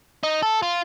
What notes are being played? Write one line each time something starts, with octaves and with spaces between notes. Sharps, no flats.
D#4
A4
F4